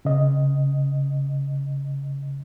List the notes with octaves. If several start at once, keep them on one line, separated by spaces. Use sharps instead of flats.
C#3 D#5